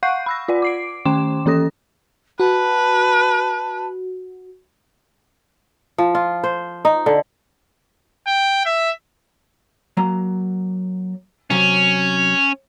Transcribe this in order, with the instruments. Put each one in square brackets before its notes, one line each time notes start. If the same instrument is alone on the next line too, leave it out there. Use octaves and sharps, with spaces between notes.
[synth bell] F5 F#5 C#6 F#6 G6 C7
B5 E6 A#6
F4 D5 F#5
D6 C7 D7
D#3 C#4 G5 C6 D6 E7
E3 C#4 A4 D#6 A#6
[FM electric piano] F#4 [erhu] B4 [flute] A5
[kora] F3
F4
C5
D#4
D3
[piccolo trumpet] G5
E5
[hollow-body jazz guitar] F#3 A#3 A#5
[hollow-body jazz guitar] C3 F#3 [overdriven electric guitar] C#4